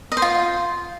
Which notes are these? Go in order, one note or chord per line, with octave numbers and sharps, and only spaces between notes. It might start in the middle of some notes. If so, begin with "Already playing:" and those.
D#5
C5
F4